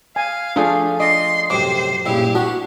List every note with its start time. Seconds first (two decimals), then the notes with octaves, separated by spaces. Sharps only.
0.16 F5 G#5
0.56 F3 A3 D4 G#4
1.00 D5 D#5 C6
1.50 F#2 A2 C3 C5 D6
2.06 A#1 G2 C#3 E4 G4
2.35 D4 F#4